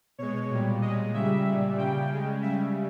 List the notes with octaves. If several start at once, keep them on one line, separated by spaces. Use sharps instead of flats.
B2 G#3 C#5
A#2 G3
A#2 G#3 D#5
C#3 G3 E5
A#2 G3
C#3 G3 G5
C#3 G#3
C#3 G3 E5